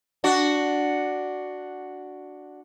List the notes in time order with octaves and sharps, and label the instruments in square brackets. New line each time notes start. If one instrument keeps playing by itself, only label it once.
[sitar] D4 F#4